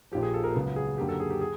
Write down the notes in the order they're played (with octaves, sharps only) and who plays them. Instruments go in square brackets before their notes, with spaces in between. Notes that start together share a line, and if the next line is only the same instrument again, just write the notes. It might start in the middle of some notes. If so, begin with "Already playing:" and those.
[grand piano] A#1 A#2 F3 G4
G#4
A4
A#4
C#2 C#3 F#3 B3
G#4
F#2 D3 F#3 A#3 G4
A4
G#4
G4
G#4